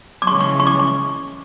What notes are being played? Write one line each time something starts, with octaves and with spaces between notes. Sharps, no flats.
D6
C#3 E3 G#3 C#4 C#6
C#6
C#6
D6
C#6